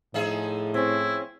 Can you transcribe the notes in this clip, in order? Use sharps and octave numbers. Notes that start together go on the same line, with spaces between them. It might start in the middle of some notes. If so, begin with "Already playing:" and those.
A2 F3 D#4 G#4 E5
C4 C#4 E4